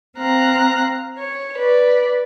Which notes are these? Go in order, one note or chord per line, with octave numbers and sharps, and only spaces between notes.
C4 F5 A#5 F#6
C#5
B4 D5